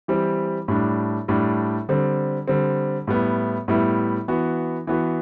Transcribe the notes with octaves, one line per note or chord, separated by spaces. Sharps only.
E3 G3 C4 G4
A2 G3 D4
A2 G3 D4
D3 G3 C4
D3 G3 C4
A2 G3 B3 E4
A2 G3 B3 E4
E3 B3 F#4
E3 B3 F#4